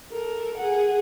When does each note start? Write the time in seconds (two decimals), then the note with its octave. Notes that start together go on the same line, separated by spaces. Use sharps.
0.12 A4 A#4
0.57 G#4 F#5